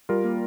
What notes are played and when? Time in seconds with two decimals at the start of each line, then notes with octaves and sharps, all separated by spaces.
0.09 G3 F4 A#4
0.24 A#3